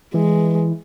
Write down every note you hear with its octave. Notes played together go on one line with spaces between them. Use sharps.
E3 G#3